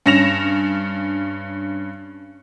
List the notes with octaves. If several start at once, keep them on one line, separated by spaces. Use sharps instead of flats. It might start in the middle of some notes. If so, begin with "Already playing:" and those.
G2 C#4 A#6 E7 F7